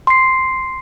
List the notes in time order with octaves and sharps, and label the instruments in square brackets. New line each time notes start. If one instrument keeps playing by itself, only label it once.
[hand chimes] C6 C7